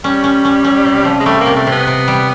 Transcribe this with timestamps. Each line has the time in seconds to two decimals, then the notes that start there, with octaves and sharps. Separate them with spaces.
0.04 G3 C#4
0.24 C#4
0.45 C#4
0.65 C#4
0.85 C3
1.05 F3
1.20 G#3
1.26 G3 A3
1.41 A#3
1.46 C3
1.57 A3
1.67 C3 B3
1.87 C3
2.08 G3